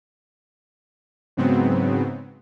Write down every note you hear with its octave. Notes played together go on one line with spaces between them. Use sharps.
G#2 C#3 F#3 B3 C4